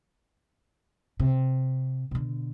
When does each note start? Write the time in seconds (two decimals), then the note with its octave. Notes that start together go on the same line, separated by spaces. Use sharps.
1.20 C3
2.11 B2 D3